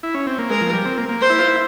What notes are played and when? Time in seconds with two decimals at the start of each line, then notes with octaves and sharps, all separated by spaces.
0.03 E4
0.14 C#4
0.27 C4
0.39 A#3
0.50 G#3 A#4
0.61 F3
0.73 G3
0.85 C4
0.97 A#3
1.09 A#3
1.21 C5
1.30 E4
1.38 F4
1.47 E4